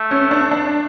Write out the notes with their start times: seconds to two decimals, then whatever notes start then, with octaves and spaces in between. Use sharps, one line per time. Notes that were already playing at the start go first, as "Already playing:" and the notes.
Already playing: A3
0.11 C#4
0.31 D4
0.51 D4